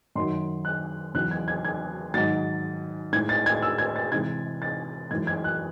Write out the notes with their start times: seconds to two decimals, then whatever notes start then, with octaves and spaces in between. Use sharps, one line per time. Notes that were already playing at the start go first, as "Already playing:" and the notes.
0.15 F#2 D#3 F#3 C6
0.65 F#6
1.14 E2 C#3 F#3 F#6
1.31 G#6
1.48 G#6
1.65 G#6
2.14 G#2 D#3 F#3 A6
3.13 A2 G#3 G#6
3.29 A6
3.46 G#6
3.63 E6
3.78 G#6
3.96 A6
4.12 C3 E3 G#3 G#6
4.62 A6
5.11 F#2 E3 G#3 G#6
5.27 G#6
5.44 F#6